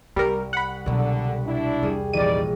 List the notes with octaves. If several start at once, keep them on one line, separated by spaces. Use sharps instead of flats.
C2 G3 C4 A#4
F#5 B5
C2 B2 D3 F#3
D4 E4
E2 G3 G#4
A#1 E3 G3 D#4 D5 D#7